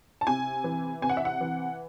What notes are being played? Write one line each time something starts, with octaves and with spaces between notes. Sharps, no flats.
A5
C3 G#5
E3
C3 G#5
F#5
E5
F#5
E3